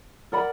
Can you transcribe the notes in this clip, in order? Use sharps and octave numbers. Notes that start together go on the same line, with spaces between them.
A#4 D5 F#5 B5